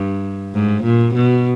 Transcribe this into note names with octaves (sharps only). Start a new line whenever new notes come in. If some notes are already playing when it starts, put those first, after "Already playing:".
Already playing: G2
G#2
A#2
B2